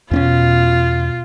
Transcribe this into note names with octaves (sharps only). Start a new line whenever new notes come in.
E2 B2 C4 C#4 F4